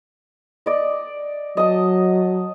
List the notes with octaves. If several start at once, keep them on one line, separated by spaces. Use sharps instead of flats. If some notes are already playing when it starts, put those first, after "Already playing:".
D5 D#5
F#3 D#5 A5